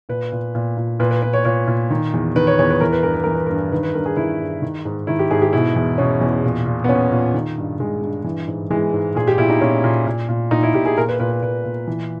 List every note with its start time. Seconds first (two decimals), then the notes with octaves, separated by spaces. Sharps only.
0.09 A#2 B4
0.32 A#2
0.55 A#2
0.77 A#2
1.00 A#2 B4
1.11 B4
1.22 A#2 B4
1.33 C#5
1.45 A#2 C#5
1.67 A#2
1.91 D#3
2.14 E2
2.36 D#3 B4
2.47 C#5
2.59 E2 C#5
2.70 B4
2.81 E3 A#4
2.93 B4
3.03 G2 A#4
3.14 B4
3.24 E3 A#4
3.35 B4
3.46 A#4
3.50 G2
3.72 D#3 B4
3.83 B4
3.94 G2 A#4
4.06 G#4
4.17 D#3 E4
4.40 G2
4.62 D#3
4.85 G#2
5.07 D#3 E4
5.19 G4
5.31 G#2 G#4
5.42 G4
5.53 B2 E4
5.76 E2
5.98 B2 C#4
6.21 E2
6.44 A#2
6.66 A#2
6.84 B3
6.89 A#2 C#4
7.11 A#2
7.34 D#3
7.58 G2
7.79 D#3 G#3
8.02 G2
8.24 E3
8.48 G#2
8.70 E3 G#3
8.93 G#2
9.15 A#2 G#4
9.27 G4
9.38 A#2 E4
9.50 D#4
9.61 A#2 C#4
9.84 A#2
10.06 A#2
10.29 A#2
10.51 A#2 D#4
10.63 E4
10.74 A#2 G4
10.86 G#4
10.97 A#2 A#4
11.09 B4
11.20 A#2 B4
11.31 B4
11.42 A#2 B4
11.65 A#2
11.88 E3